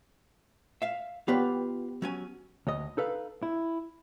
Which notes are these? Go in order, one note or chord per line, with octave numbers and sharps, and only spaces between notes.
E5 F5
B3 F4 G4 B4
F#3 C#4 G#5
D2 C#5 D#5
D#4 A4 B4 F5
E4